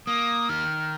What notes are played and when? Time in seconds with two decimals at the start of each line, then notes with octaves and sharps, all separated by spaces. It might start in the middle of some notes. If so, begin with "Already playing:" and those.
0.07 A#3 D#6
0.49 D#3 F6